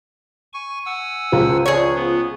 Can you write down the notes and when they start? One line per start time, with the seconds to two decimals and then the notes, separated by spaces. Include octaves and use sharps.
0.53 G#5 C#6
0.86 F#5 G#5 E6
1.32 C#2 F3
1.66 G#4 C#5
1.95 B3